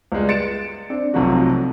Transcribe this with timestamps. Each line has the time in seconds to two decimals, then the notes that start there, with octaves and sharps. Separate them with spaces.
0.12 C#2 G3 G#3
0.29 A6 C#7 D7 E7
0.90 C4 D4
1.14 B1 C3 F3 F#3 A3 F#4